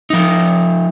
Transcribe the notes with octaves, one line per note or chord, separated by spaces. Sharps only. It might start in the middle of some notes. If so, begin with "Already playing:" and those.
F3 D#4